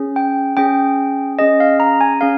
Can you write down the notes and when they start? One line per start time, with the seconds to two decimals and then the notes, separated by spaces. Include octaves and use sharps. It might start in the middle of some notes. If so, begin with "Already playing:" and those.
Already playing: C#4 G#4
0.16 G5
0.57 C#4 G#4 G5
1.39 C#4 G#4 D#5
1.60 F5
1.80 A#5
2.01 G#5
2.21 C#4 G#4 F5